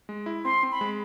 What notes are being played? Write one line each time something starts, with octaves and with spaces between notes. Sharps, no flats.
G#3
E4
C4 C6
C4
B5
G#3